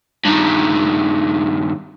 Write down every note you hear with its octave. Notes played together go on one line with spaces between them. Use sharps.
G2 D#3